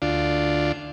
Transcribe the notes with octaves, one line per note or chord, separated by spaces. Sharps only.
D2 D4 F4